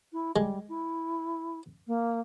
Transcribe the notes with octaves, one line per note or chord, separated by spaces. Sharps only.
E4
G3 G#3
E4
A#3